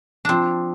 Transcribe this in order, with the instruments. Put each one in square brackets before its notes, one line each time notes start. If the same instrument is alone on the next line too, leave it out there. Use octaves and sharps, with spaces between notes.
[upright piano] F3 [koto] C4 D4